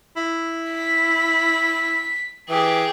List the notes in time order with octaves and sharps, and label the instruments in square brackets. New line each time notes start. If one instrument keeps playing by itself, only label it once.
[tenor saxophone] E4
[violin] B6
[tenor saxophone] E3 [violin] G4 G#4